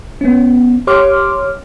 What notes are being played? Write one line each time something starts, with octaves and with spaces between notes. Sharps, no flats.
B3 C#4
G4 C#5 C6 D6 F6